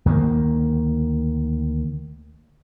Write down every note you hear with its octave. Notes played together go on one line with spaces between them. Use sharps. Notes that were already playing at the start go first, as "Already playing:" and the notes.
D2 D#3 F3 A#3